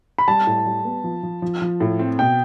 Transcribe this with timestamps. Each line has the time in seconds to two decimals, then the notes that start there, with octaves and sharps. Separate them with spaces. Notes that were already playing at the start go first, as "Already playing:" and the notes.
0.18 B5
0.28 G3 A5
0.47 A2
0.66 G3
0.85 B3
1.04 F3
1.23 F3
1.42 F3
1.62 F3
1.80 A2
1.99 C4
2.19 B2 G5